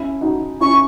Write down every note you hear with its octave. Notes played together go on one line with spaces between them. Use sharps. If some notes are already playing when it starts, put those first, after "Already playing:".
Already playing: C#4 E4
D#4 F#4
C#4 E4 C#6